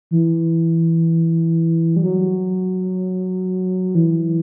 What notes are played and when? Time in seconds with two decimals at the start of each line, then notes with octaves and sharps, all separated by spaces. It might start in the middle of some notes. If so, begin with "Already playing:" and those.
0.11 E3
1.96 G3
2.03 F#3
3.95 E3